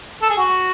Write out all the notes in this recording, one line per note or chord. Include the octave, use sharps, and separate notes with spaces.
A4
G#4
F#4